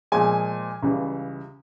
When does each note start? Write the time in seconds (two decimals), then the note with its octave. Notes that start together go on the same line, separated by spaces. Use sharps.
0.12 A#2 F3 G#3 G#5
0.83 C#2 C#3 E3 G3